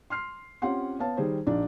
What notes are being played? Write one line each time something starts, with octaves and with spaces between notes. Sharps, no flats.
C6 F6 C7
C4 C#4 F4 G4 F#5 C6
B3 C#5 F5 A5
D#3 G3 G#4 C5
A#1 D4 D#4